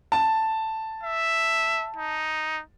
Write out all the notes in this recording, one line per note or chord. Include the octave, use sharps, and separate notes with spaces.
A5
E5
D#4